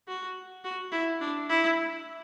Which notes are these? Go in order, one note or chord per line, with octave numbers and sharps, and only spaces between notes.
F#4
F#4
E4
D4
E4